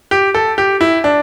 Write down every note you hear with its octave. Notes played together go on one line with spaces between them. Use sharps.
G4
A4
G4
E4
D4